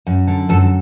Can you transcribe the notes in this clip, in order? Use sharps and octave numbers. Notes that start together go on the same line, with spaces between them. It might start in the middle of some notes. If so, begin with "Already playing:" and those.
F#2
D3
F#2 A4